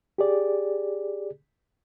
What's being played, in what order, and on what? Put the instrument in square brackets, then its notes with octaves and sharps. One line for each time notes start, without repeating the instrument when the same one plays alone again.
[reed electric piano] G4 G#4 D5